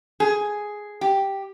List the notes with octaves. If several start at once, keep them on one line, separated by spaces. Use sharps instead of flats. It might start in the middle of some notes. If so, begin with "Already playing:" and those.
G#4
G4